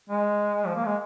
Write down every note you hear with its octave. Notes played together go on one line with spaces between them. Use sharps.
G#3
F3
A#3
G#3